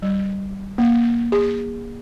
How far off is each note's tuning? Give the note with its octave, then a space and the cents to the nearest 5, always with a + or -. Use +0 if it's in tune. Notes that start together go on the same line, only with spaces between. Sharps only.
G3 -10
A#3 +20
G#4 -35